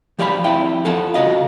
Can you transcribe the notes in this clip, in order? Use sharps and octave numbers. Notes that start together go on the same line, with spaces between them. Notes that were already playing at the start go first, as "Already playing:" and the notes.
F3 G4 D5 F5 G#5 B5
F2 E4 G5 B5
F4 A4 F#5 A5
C#3 F#4 D#5 F5